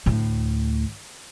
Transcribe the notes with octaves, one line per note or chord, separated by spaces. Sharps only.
D2 A2